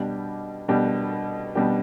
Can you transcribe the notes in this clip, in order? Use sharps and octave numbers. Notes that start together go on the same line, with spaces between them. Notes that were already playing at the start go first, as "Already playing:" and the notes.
Already playing: B2 G3 D4 G4
B2 G3 D4 G4
B2 G3 D4 G4